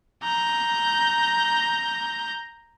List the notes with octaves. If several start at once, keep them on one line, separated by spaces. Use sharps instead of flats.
A#5 G6